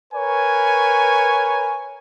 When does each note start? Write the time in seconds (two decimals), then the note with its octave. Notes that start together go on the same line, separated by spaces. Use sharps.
0.14 A#4 B4 C#5 G#5